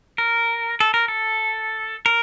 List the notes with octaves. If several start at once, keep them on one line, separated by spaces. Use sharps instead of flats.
A#4
A4
A#4
A4
A#4